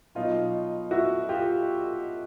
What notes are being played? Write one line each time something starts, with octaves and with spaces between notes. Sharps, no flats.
B2 F#3 D#4 F4
E4 F#4
F4 G4